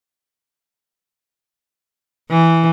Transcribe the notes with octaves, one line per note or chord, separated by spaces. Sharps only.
E3